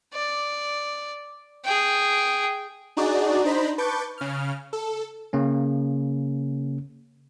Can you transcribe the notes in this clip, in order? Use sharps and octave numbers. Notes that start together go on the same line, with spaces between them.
D5
G#4 G5
D4 D#4 F#4 G#4 D5
D4 D#4 C5 A#5 B5
B4 A5 C#6 D6 G6
C#3 F6
A4
C#3 A#3 C#4